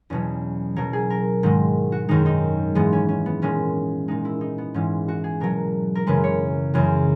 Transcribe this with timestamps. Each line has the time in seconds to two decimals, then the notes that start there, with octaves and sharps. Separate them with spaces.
0.10 E2 B2 F#3 C#4
0.76 B2 F#3 A#4
0.93 G#4
1.10 A#4
1.43 G#2 D#3 G#3
1.92 F#4
2.09 F#2 D#3 G#3 D#4
2.26 D#4
2.75 G#2 E3 G#3 B3
2.93 C#4
3.09 C#4
3.26 B3
3.42 A#2 G#3 C#4
4.08 A#2 G#3 D#4
4.25 E4
4.41 D#4
4.58 B3
4.74 G#2 E3 G#3 C#4
5.08 F#4
5.24 G#4
5.40 B2 F#3 A#4
5.95 A#4
6.07 F#2 C#3 E3 G#3 B4
6.24 C#5
6.74 F#2 C#3 E3 G#3